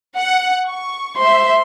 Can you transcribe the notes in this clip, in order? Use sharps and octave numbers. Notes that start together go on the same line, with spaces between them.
F#5
C#6
C5 E5 C6